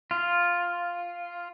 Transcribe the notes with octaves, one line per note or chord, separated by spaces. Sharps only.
F4